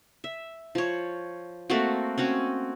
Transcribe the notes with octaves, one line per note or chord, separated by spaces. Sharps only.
E5
F3 C#5
A3 A#3 C4 F#4
C4 C#4 F#4 C#5